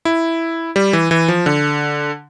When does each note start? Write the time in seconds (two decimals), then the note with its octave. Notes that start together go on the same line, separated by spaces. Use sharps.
0.05 E4
0.76 G3
0.93 E3
1.11 E3
1.28 F3
1.46 D3